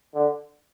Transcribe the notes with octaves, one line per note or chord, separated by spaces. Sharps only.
D3